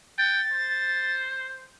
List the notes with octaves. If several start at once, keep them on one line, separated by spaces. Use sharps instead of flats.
G5 A6
C5